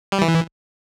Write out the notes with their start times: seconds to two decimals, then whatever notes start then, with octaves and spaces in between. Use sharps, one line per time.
0.12 G3
0.22 E3